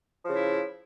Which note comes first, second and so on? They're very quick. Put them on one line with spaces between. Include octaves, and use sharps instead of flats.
F3 C#3 E4